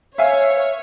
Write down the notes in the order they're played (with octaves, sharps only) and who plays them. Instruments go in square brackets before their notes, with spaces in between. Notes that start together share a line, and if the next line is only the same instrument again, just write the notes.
[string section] C#5 [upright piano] E5 F5 G#5